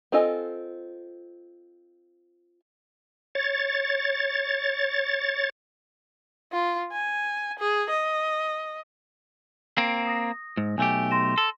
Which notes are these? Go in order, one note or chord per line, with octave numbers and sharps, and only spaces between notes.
C4 F4 A4 D#5 G#5
C#5 A6
F4
G#5
G#4
D#5
A#3 C4
D#6 A#6
G#2
B1 A3 G4 G#5
C6 A#6 E7
A4